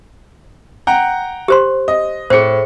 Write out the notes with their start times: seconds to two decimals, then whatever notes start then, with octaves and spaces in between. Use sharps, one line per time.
0.87 F#5 G5 A#5
1.48 G4 C5 C6
1.88 D#5
2.30 A2 G#4 C5 C#7